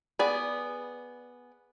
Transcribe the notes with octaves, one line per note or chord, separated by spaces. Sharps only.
B3 G#4 D5